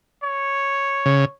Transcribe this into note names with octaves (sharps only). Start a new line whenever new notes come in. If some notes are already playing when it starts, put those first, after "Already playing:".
C#5
C#3